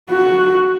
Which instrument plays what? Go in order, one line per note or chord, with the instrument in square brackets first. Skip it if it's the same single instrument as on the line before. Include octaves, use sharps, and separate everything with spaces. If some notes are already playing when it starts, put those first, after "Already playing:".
[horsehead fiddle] F#4